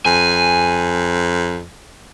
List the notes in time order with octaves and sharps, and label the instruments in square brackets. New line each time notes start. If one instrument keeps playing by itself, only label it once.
[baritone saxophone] F2 [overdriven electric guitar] G#5